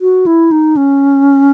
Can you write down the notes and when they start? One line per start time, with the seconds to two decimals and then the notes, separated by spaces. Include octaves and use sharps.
0.01 F#4
0.26 E4
0.51 D#4
0.77 C#4